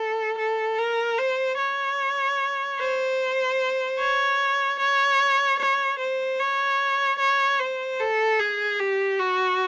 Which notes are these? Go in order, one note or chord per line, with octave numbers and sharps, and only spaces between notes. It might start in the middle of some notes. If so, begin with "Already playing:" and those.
Already playing: A4
A4
A#4
C5
C#5
C5
C#5
C#5
C#5
C5
C#5
C#5
C5
A4
G#4
G4
F#4